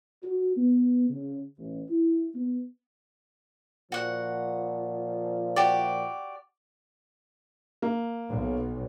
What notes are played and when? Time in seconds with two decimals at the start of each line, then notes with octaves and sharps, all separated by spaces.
0.24 F#4
0.57 B3
1.10 C#3
1.58 A1
1.90 E4
2.35 B3
3.92 A#2 F3 F#4 F#5
5.56 F#4 G4 D5
7.82 A#3
8.29 B1